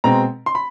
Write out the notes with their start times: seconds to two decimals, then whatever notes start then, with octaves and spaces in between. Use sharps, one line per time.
0.04 B2 G#3 C4 A#5
0.46 C6
0.55 B5